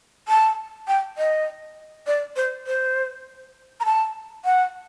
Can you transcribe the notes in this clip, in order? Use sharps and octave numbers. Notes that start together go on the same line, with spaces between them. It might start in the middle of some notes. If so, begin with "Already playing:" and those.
A5
G5
D#5
D5
C5
C5
A#5
A5
F#5